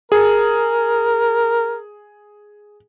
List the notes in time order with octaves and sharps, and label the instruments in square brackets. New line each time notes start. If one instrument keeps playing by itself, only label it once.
[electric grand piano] G#4 [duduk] A#4